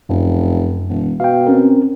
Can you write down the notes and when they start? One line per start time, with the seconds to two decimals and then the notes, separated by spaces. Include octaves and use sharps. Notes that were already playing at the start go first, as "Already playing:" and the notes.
0.09 F1 F#2
0.89 E1
1.20 B2 F5 G5
1.47 C4 C#4 A#4